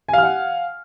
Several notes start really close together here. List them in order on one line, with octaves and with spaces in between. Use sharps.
G#5 F5 F6 F#5